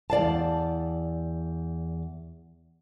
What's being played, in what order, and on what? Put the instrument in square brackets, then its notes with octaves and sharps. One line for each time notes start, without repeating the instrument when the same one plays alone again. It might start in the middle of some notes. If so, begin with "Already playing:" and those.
[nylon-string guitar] E2 D5 F5 A5